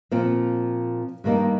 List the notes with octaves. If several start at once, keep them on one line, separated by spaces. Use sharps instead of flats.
A#2 F3 C4
G2 D#3 G3 A#3 D#4